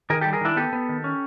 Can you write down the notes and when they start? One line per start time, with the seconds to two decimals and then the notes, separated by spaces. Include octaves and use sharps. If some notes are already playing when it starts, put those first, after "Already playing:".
0.10 D#3 G#4 A#4
0.21 G3 G4 A4
0.33 G#4 A#4
0.41 D#3 D4 E4
0.56 B3 G4 A4
0.73 B3
0.89 D#3
1.04 C#4